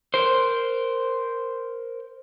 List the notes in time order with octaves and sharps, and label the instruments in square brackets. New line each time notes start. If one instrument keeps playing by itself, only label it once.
[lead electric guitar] A#4 C5